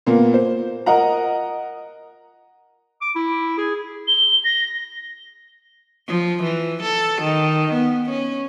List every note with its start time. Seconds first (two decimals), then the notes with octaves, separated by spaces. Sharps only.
0.06 A#2 A#3 B3
0.34 C5
0.86 A#4 D#5 F#5 A#5
3.02 D6
3.15 E4
3.58 G#4
4.08 G7
4.44 A#6
6.08 F3
6.43 E3
6.83 A4
7.22 D#3
7.74 B3
8.10 C#4